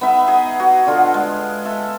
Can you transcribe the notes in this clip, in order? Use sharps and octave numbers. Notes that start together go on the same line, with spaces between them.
B3 D#4 E5
G#4 D#5
F#4
D3 F4
G#3
A4 E5